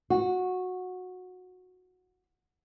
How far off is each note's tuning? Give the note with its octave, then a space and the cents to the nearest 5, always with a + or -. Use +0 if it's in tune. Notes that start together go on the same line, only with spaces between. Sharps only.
F#4 -15